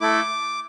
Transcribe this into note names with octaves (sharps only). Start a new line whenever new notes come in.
A3 E4 A4 D6